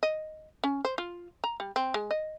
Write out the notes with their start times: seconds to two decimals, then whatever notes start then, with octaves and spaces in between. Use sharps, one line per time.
0.03 D#5
0.64 C#4
0.85 C5
0.98 F4
1.44 A#5
1.60 G3
1.76 C4
1.94 G#3
2.11 D#5